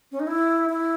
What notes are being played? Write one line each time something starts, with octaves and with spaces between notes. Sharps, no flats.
C#4
D#4
E4
E4